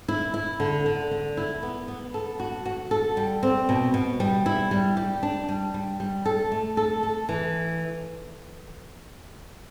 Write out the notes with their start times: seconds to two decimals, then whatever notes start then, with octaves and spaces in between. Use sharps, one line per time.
0.08 E4
0.34 E4
0.60 D3
0.86 D3
1.11 D3
1.37 E4
1.63 B3
1.88 B3
2.14 A4
2.40 F#4
2.65 F#4
2.91 A4
3.17 G3
3.43 C4
3.69 B2
3.94 B2
4.20 G3
4.46 E4
4.71 G3
4.97 G4
5.23 D4
5.49 G3
5.74 G3
6.00 G3
6.25 A4
6.52 A3
6.77 A4
7.03 A4
7.29 E3